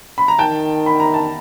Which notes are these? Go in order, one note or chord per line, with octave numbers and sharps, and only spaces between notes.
B5
A#5
D#3 G5 A5
B5
A#5
A5